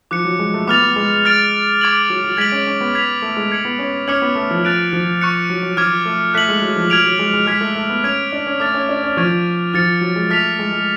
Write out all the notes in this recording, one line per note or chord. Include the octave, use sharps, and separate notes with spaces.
F3 D6 F#6 C#7
F#3
G#3
A3
B3 D6 F6 A6 F7
B3
G#3
F6 A6 D7 F7
D6 G#6 D7 F#7
F#3
F#3
G#3 G#6 B6 D7 F#7
C#4
C#4
B3
G#6 B6 F7
A3
G#3
G#6 C#7 F#7
B3
C#4
C#4 D6 F6 G#6 C#7 F#7
B3
A3
F3
F#6 A6 D7 F7
F3
C#6 F#6 C#7
F#3
F#3
F3 D6 F6 G#6
A3
A3 F#6 B6 F#7
G#3
F#3
F3
F#3 F6 G#6 D7 F7
F#3
G#3
G#3
G#3 F6 G#6 B6 F7
A3
A3
B3
C#4 G#6 D7 F7
D4
C#4
A3 D6 F6 A6
C#4
D4
C#4
F3 C#6 F6 G#6 D7 F7
F3 F6 A6 C#7
F#3
G#3
A3 F6 B6 F7
G#3
G#3